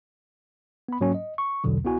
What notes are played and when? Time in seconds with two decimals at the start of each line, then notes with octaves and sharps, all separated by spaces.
0.88 B3 B5
1.01 G#2 F#3 A#3 C#4
1.14 D#5
1.38 C#6
1.64 B1 E2 B2 D3 F#3
1.84 C2 B3 E4 F#4 G#5